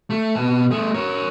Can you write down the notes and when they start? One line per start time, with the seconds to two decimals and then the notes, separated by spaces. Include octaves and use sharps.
0.10 A3
0.36 B2 A5
0.71 A3 G#4
0.94 A#4 C#5